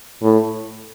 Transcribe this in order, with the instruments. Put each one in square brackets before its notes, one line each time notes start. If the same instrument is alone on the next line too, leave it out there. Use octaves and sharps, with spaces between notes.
[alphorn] A2